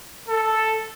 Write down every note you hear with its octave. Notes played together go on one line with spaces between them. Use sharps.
A4